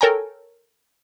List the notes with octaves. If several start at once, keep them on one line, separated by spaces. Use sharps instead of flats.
A4 A#4 C#5 G5 G#5 A#5